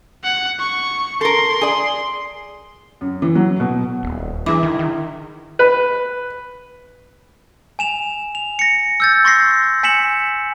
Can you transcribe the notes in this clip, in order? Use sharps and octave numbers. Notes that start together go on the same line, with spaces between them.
F#5
C#6
A4 A#4 C6
G#4 D5
F#2
E3
F#3
B2
D#1
E3 D4 E4 G#4 D6
D#3
D#3
B4
G#5 E7 F7
F7
A#6 C#7
E6 G6 A6
C6 C#6 A6 A#6 C7
G#5 B6 C#7 E7 F#7